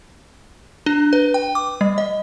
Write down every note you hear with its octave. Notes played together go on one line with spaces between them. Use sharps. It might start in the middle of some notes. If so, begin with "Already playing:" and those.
D4
B4
G5
D6
G3
D#5